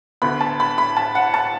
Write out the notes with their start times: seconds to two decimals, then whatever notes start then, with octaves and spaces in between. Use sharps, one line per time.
0.22 D2 D3 B3 B5
0.41 A5
0.60 B5
0.78 B5
0.97 A5
1.15 F#5
1.34 A5